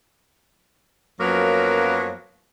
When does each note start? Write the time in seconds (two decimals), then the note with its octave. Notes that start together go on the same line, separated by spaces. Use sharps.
1.20 F#2 F3 F#3 A#3 B3 A#4